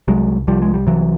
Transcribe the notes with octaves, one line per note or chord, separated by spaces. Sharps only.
C2 F#3 G#3
C2 F3 G3
G#3
G3
C3 E3 F#3